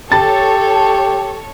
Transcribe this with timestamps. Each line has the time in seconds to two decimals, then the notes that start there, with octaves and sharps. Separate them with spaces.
0.12 G4 A4 C#5 A5 A6